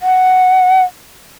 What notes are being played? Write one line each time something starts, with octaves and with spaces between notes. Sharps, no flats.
F#5